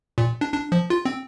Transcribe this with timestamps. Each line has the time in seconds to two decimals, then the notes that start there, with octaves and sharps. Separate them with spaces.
0.18 A#2
0.41 D4
0.53 D4
0.72 F3
0.90 F4
1.05 C4